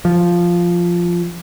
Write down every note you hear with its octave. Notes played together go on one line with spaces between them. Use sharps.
F3